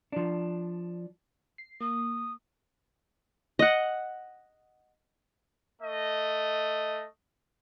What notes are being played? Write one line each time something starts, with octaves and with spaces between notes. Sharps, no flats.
F3 D4
C7
A#3 D#6
D#5 F#5
A3 D#5